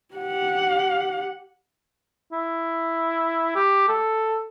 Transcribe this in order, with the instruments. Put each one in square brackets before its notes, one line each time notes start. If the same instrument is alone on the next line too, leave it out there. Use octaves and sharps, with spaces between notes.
[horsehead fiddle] G4 F#5
[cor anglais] E4
G4
A4